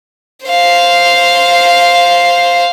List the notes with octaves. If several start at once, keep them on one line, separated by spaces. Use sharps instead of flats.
C5 F5